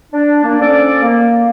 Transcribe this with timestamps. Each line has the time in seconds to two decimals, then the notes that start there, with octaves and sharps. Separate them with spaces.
0.12 D4
0.43 A#3 D4
0.60 F3 C#4 A4 D5
1.02 A#3